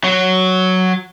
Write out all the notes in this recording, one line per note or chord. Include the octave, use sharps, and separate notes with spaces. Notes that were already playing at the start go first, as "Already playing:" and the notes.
F#3